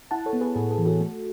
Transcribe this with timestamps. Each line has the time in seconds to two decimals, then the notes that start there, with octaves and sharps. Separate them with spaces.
0.11 E4 F#5 A5
0.26 A4 C#5
0.33 B3
0.41 G#4 B4
0.56 A2 G#4
0.71 G#4
0.78 E3
0.86 F#4 A4
1.01 A3